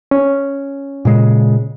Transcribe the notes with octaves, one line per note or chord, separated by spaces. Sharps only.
C#4
A#2 C#3 G#3